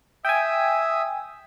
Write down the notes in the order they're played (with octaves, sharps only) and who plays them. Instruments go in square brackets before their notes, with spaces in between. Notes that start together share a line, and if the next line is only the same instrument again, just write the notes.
[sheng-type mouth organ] E5 D#6 E6 [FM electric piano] G5 G#5